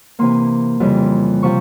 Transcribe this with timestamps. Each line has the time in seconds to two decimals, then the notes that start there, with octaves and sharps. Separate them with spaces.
0.19 C3 E3 A#3 C6
0.80 F2 C#3 E3 G3
1.43 C3 F3 C#6